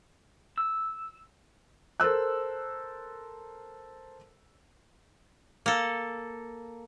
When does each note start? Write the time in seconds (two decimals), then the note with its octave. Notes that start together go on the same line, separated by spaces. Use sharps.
0.58 E6
2.00 A4 A#4 C5 E6 F#6
5.66 A#3 A4